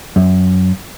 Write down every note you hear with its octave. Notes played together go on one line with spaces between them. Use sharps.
F#2